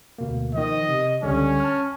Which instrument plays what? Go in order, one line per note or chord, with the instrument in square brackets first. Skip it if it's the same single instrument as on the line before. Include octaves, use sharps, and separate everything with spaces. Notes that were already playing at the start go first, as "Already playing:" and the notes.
[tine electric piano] D2 B2 A#3
[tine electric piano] D#3 F3 [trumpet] D#5
[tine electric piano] C3
[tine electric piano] C#2 D3 G3 [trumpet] C#4
[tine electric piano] A5 F6